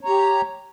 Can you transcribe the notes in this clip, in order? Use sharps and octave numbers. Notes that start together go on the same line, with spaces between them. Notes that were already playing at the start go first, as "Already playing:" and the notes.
G4 C#5 A#5